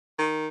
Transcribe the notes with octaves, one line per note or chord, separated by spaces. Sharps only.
D#3